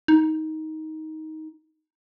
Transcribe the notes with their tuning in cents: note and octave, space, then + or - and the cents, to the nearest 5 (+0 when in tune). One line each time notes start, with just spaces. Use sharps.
D#4 +15